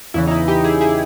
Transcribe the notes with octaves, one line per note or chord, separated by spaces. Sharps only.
E2 C#3 E3 E4
D#4
E4
D#4 G4
E4 G#4
E4 G#4